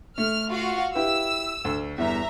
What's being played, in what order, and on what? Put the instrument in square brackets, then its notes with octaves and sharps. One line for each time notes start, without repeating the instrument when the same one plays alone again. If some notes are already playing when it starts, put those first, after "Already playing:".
[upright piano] A3 [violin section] F6
[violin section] F4 F#4 F5
[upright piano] E4 G4 B4 [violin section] E6
[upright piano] D2
[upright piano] G1 E2 [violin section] E5 A#5